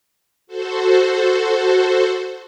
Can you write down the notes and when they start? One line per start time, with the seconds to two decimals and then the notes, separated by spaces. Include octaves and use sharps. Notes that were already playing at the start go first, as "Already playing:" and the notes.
0.47 F#4 A4 C5